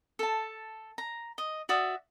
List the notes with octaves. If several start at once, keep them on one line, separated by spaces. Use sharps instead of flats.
A4 A5
A#5
D#5
F#4 D5 E5 D#6